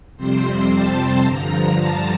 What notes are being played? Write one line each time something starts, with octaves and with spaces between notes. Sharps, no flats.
F2 C3 G3 C4 C5
A5
G2 D3 F3 A#5
A5